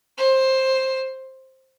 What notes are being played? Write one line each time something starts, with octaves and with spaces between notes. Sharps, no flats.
C5